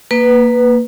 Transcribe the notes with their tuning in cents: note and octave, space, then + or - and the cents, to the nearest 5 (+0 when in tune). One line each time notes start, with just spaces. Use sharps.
A#3 +0 B4 +0